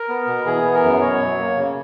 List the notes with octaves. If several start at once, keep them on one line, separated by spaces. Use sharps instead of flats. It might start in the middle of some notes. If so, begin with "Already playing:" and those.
Already playing: A#4
B3
B2
E3 G#4
B3
A#4
F#2
B2 C#5
F#3
A#3
C#3